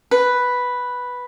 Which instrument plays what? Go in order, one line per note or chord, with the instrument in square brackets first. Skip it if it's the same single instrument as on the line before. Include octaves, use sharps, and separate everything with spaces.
[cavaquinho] B4